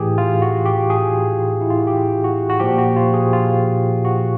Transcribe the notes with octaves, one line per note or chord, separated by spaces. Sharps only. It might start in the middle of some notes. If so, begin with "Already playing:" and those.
Already playing: A2 E3 G4 G#4
F4
F#4
G4
G#4
E4
F4
F#4
G4
F#4
F#4
A#2 F3 G4
F#4
F4
G#4
F4
F#4